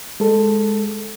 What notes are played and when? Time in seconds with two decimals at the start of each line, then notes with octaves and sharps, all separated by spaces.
0.20 G#3 A4